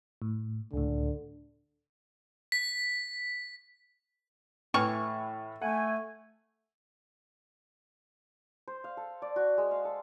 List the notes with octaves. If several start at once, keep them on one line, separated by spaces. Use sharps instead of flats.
A2
C#2 A2 D3
B6
A2 E3 C#6 F6
A3 F#5 G#5
C5
F5
A4
D5
F#4
G#3
F5
A4